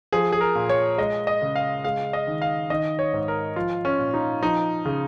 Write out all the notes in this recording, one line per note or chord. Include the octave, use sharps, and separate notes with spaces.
F3 G#4
G#4
A#4
A#2
C#5
G#3 D#5
D#5
C#3
F5
G#3 F5
D#5
D#3
F5
D#3 D#5
C#5
G#2
A#4
F3 F4
C#4
A#2
D#4
F3 D#4
C#3